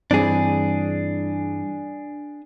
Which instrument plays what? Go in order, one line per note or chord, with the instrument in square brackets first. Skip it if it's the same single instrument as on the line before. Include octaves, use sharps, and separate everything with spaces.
[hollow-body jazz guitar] G2 E3 C4 [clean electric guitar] D4 G#4